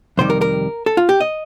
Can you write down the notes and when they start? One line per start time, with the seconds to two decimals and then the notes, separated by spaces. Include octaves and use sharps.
0.18 F2 C3 D#3 G3 C5
0.30 A#4
0.41 A#4
0.86 A4
0.97 F4
1.09 G4
1.20 D#5